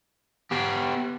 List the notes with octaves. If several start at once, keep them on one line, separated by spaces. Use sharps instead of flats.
B3 G4